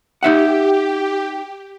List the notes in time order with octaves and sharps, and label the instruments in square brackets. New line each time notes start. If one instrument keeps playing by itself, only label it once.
[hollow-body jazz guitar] D#4 E5 F#5 [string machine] G4